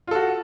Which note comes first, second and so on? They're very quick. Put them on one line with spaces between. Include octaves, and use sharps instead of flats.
F4 A4 F#4